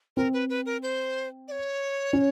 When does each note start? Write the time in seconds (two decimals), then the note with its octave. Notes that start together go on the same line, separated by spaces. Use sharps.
0.17 C4 A#4
0.33 B4
0.49 B4
0.66 A#4
0.83 C5
1.48 D5
1.52 C#5
2.13 C#4